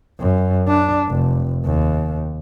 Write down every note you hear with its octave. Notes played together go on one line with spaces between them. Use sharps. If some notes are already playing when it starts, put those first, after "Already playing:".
F#2
D4
F1
D#2